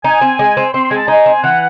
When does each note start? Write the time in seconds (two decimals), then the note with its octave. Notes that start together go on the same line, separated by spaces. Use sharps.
0.04 D#4 G#5
0.21 C4
0.39 G#3
0.57 C4
0.74 C4 C6
0.85 C6
0.91 G#3 G#5
0.97 A5
1.08 D#4 G#5
1.26 C4
1.43 E3 F#5